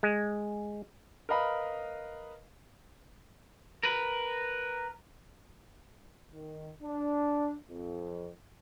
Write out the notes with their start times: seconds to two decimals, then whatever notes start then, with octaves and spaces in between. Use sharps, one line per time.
0.03 G#3
1.29 A#4 B4 D#5 F5 B5
3.83 A#4 B4
6.33 D#3
6.82 D4
7.70 F2